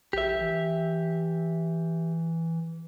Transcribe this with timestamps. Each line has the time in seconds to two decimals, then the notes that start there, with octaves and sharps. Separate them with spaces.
0.13 A#1 G4 E5
0.41 E3